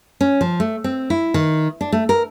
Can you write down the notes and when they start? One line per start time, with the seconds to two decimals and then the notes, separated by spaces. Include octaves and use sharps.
0.21 C#4
0.41 F3
0.60 A3
0.84 C4
1.10 E4
1.34 D#3
1.81 D4
1.92 A3
2.09 A#4